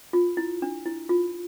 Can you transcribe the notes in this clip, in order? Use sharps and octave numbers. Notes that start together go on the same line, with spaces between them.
F4
E4
D4
E4
F4